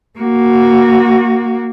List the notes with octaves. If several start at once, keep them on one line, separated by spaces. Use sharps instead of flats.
A#3 F#4